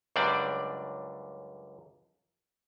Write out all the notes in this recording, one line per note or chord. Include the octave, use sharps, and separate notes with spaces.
C#2 F#2 G3 C4 D4 D5